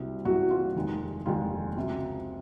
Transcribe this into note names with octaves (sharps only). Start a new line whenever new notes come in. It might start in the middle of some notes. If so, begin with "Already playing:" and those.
Already playing: C2 C3 F#3
C2 C3 F#3 F#4
F4
F1 D#2 D#3 G#3
F1 D#2 D#3 G#3 F4
C#2 C3 F#3